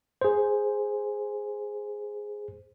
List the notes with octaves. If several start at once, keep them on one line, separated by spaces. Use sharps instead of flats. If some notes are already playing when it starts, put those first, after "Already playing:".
G#4 C5